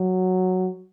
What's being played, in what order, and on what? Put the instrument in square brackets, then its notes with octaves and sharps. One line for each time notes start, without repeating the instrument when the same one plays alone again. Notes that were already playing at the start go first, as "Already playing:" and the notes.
Already playing: [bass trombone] F#3